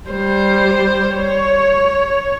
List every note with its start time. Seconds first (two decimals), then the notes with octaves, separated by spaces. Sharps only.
0.11 G3 C5
1.16 C#5